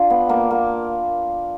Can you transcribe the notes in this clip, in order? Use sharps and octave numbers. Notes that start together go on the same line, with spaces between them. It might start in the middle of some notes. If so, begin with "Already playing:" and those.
Already playing: D4 F4
B3
A#3
A#3